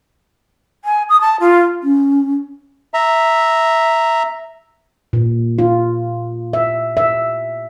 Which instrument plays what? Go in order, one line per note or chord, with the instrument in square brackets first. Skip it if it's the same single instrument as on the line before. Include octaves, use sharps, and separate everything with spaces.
[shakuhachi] G#5
D#6
A5
F4
[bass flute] C#4
[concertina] E5 A#5
[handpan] A#2
F4
E5
E5